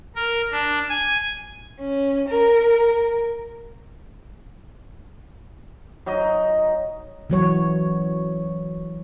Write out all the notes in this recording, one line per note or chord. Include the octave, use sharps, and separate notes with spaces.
A#4
D4
G#5
C#4
A#4
F#3 D#4 D#5
E3 F#3 C#5